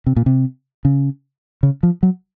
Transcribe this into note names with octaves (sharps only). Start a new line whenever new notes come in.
C3
A#2
C3
C#3
C#3
F3
F#3